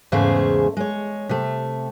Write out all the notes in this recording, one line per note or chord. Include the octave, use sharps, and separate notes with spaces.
E2 G#2 C#3 A3 G#4 C5
G#3 C#5
C3 A3